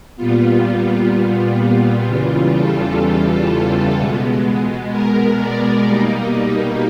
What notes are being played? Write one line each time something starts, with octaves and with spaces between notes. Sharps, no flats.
A#2 G3 B3 F4
F4
E2 C#3 E3 G3 F4
A4
B2 G#3 B3
A#4
D5
B2 G3 A#3 D#4